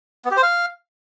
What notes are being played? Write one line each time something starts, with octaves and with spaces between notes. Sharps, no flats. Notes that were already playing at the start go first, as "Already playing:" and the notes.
B3
G4
C5
F5